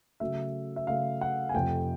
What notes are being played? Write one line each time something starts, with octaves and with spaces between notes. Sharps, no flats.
C#3 F#3 A3 E5
E5
C#3 F#3 A3 F5
F#5
G#5
F2 C3 F3 A3 G5